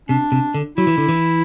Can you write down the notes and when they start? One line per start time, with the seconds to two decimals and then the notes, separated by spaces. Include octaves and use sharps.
0.09 C3 D4
0.32 C3
0.55 D3
0.77 F#3 E4
0.87 E3
0.98 D3
1.09 E3